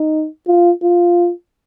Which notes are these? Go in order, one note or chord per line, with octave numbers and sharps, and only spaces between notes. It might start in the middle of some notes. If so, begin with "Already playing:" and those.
Already playing: D#4
F4
F4